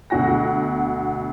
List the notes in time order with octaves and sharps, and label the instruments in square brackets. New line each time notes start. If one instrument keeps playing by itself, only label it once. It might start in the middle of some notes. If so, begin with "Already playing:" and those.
[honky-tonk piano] D2 B2 F#4 G5 A#6